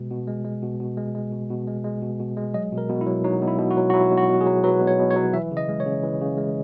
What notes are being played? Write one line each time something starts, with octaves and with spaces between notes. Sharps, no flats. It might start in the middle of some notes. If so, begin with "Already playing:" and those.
Already playing: B2 G#3
B2
G#3
G#3
B2
B2
G#3
G#3
B2
B2
G#3
G#3
B2
B2
G#3
F#3 D#5
B2
A#4
B2
E4
F#3
F#3 D#4
B2
E4
B2
F#4
F#3
F#4
F#3 E4
B2
F#4
B2
G#4
F#3
F#3 B4
B2
C#5
B2
C#5
F#3
E3 E5
C#3
D#5
G#3
C#5
C#3
E3
C#3
G#3